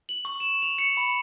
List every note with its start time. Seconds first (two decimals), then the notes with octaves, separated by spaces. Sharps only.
0.09 F#7
0.25 C#6
0.40 E7
0.62 F7
0.78 C#7
0.97 B5